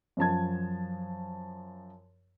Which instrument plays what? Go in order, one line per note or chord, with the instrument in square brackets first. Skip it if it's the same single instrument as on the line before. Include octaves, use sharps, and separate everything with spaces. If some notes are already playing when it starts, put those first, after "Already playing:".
[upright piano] F#2 F3 A5 G#6